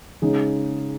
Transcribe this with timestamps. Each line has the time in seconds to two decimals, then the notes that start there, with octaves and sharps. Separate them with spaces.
0.22 C#3 G#3 D#4